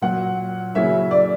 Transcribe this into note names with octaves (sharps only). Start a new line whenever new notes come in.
A#2 F#3 A#3 F#5
C#3 F#3 A#3 C#4 E4 E5
D5